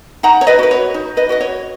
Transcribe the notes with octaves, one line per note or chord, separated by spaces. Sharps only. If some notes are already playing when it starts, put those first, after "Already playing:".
D#4 F#5 A#5
C#5
B4 D#5
F#4 B4
C#5
D#4
B4 D#5
F#4 B4 D#5
C#5